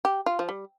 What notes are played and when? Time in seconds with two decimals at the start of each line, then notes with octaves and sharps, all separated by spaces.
0.05 G4
0.26 F4
0.39 F3
0.49 G3